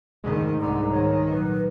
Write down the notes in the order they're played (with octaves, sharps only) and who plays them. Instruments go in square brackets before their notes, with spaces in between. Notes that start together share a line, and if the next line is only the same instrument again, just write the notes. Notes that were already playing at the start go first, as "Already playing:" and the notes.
[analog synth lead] G#2 [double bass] D#3 [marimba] A3
[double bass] C2 D3 [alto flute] A#5
[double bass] D#3 [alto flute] C#5
[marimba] A#2 F#3 [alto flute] B4